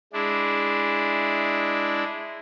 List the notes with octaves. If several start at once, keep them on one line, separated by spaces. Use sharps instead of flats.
G#3 D4 E4